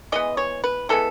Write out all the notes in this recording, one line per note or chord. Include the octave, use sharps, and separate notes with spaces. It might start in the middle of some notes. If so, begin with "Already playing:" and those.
E3 G#3 B3 D#5
C#5
B4
E3 G#3 B3 A4